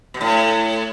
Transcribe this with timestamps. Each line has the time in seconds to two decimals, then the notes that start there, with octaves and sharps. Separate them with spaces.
0.14 B2
0.21 A2